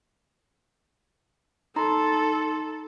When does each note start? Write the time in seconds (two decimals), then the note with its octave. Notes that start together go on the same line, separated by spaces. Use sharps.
1.76 D#4 A4 A#5 C6